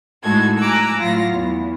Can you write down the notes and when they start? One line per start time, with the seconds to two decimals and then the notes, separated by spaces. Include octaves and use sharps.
0.23 A2 G#3 D#4 F#4 A4 G#6
0.59 G#5 A#5 D6 E6 F#6
0.98 A2 F#3 F4 A#6
1.32 E2